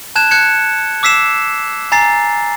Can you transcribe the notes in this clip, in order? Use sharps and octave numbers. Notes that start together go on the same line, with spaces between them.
A5 F#6 G#6 E7
F#6 G#6 C#7
D6 E6 B6 C7 E7
G#5 A#5 A6 C7